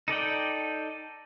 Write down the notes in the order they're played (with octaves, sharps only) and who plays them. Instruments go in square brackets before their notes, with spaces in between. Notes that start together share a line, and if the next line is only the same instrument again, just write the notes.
[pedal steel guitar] D#4 A4 D5 G5